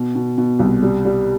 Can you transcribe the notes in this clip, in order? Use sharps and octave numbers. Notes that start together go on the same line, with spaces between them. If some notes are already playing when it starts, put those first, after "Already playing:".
Already playing: B2
B2
B2
C2
G3
G3